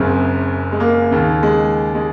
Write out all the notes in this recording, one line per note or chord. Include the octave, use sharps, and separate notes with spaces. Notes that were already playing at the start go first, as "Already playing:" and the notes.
Already playing: F#1 F#2 C#3 C4
G#3
A#3
D#2 C#3
G#3
G#3